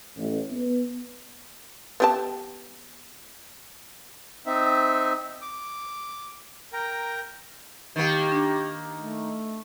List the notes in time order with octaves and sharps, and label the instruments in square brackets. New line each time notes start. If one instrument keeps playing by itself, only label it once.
[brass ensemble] A1
B3
[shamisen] B3 G4 A5
[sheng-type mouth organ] C4 D#4 E5
D6
A#4 G5 A#5
[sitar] D#3 A#3 [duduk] G4
[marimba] D4
[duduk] A3